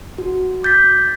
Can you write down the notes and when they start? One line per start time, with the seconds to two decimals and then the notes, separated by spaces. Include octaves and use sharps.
0.18 F#4
0.63 D6 G6 A6 B6